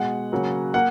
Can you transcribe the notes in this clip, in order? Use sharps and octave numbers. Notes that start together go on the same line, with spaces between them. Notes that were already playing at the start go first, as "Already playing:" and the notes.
Already playing: B2 G#3 F#5
C#3 F#3 A#3
A#3 F#5